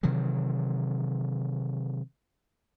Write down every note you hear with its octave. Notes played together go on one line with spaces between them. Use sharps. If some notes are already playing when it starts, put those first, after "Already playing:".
C3 D#3 E3 F#3